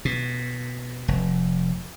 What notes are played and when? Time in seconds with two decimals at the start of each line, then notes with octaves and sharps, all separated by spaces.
0.05 B2
1.08 F1